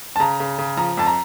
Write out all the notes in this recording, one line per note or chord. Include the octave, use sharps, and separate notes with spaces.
A5
C#3 A#5
C#3
C#3
F3 A#5
F2 A5
A#5